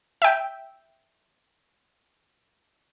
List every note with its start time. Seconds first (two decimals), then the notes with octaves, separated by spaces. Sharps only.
0.22 E5 G5